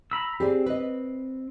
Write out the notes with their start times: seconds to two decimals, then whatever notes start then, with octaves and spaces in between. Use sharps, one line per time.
0.11 A#5 B5 E6
0.40 C4 G4 G#4 D5
0.66 B4 D#5